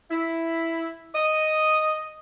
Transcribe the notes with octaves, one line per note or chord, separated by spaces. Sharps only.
E4
D#5